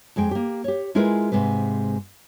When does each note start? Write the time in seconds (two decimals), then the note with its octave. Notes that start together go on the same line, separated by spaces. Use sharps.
0.16 F2 G#3 G#4 G5
0.31 A#3 G4
0.64 G4 C#5
0.95 G#3 E4 F4 G#4 A#4 B4
1.32 G#2 C3 G#3 B4